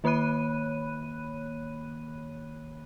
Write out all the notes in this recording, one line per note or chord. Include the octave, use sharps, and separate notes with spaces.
D#3 A#3 C#5 B5 F#6 D#7